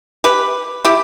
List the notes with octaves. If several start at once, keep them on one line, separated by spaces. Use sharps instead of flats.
G4 B4
E4 G4